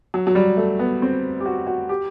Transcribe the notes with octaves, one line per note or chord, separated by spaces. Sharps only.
F#3
F#3
G3
A3
B3
C4
G4
F#4
F#4
G4